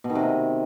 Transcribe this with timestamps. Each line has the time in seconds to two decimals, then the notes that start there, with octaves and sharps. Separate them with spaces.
0.04 B2
0.10 D#3
0.15 C3